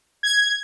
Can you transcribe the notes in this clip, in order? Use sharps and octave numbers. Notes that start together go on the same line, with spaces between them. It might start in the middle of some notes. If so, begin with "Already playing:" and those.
G#6